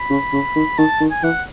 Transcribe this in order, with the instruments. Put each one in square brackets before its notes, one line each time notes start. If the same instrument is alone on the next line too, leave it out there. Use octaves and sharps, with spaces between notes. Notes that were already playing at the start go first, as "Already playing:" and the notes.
Already playing: [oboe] B5
[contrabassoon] C#3
C#3
D#3
[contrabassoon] D#3 [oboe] A5
[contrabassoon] D#3
[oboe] G#5
[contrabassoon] E3 [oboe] F#5